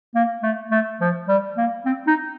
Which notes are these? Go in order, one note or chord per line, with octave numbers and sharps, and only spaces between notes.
A#3
A3
A3
F3
G3
A#3
C4
D#4